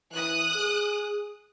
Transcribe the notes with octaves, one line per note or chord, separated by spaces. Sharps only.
E3 D#6 F#6
G#4